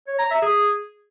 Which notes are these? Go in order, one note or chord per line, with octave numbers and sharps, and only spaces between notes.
C#5
A#5
E5
G#4